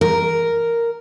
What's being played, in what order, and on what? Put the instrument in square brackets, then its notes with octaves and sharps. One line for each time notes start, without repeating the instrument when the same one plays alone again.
[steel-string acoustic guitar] A#4